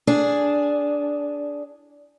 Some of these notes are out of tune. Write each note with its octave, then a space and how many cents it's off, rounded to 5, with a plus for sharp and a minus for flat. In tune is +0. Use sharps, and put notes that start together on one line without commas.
D4 -10 G#4 +0